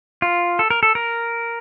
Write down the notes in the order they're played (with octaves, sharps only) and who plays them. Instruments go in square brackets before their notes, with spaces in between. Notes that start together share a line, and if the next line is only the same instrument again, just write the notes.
[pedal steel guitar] F4
A4
A#4
A4
A#4